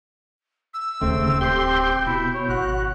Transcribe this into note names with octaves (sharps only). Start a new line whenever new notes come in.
E6
D1 D#2 C#3 A3 C4
C4 G4 C6 G6
B2 E4
C#5
G#1 F#4 F#6